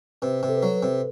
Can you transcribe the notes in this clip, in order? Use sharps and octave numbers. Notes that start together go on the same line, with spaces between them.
C3 B4
C3
A4
B4
F#3 A4
B4
C3